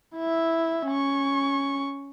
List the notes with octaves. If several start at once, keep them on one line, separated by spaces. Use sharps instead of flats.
E4 E5
C#4 C#6